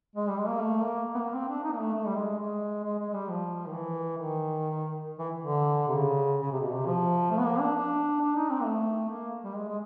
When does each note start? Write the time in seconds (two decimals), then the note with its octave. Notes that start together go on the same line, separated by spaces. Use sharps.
0.16 G#3
0.29 G3
0.38 G#3
0.49 A#3
0.60 A3
0.82 A#3
1.15 B3
1.19 A#3
1.34 C4
1.49 D4
1.64 D#4
1.72 A#3
1.79 A3
1.94 A3
2.07 G3
2.16 G#3
2.39 G#3
2.84 G#3
2.99 G#3
3.14 G3
3.28 F3
3.66 D#3
3.73 E3
4.17 D#3
5.19 E3
5.40 D3
5.88 C3
5.97 C#3
6.42 C#3
6.52 C3
6.61 B2
6.71 C3
6.86 F3
7.31 A3
7.39 B3
7.46 A#3
7.60 D4
7.76 D4
8.20 D4
8.36 D#4
8.50 C4
8.61 A#3
8.65 A3
9.09 A#3
9.44 G3
9.55 G#3
9.68 G#3